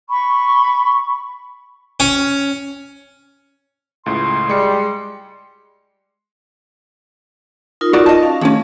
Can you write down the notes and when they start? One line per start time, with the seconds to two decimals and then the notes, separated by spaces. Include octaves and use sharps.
0.09 B5 C#6
2.00 C#4
4.06 C#2 A2 C6
4.49 G3 G#3 C#7
7.81 D#4 F4 A#4
7.93 F#4 D5
8.06 D#5 A5
8.23 C#4 F5
8.41 D#2 A3 C#4 D4